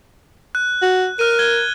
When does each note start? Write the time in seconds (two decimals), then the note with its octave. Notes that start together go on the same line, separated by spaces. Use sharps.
0.55 F#6
0.82 F#4
1.19 A#4 F6 D#7
1.39 G#6 G7